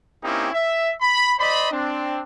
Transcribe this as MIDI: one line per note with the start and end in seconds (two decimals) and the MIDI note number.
0.24 0.49 58
0.24 0.49 60
0.24 0.49 61
0.24 0.49 63
0.24 0.49 64
0.24 0.49 67
0.53 0.92 76
1.01 1.33 83
1.39 1.71 72
1.39 1.71 74
1.39 1.71 75
1.39 1.71 83
1.72 2.21 60
1.72 2.21 62